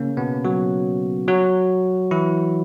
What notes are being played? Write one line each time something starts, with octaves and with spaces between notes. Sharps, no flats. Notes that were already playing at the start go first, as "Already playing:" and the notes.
Already playing: C#3 A#3 C#4
B2 B3
F#3 F#4
F#3 F#4
E3 E4